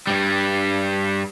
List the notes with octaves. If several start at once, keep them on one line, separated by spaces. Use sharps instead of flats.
G2 G3